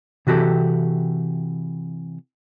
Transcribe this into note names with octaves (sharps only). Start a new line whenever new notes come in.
C3 E3 F#4 G4 A4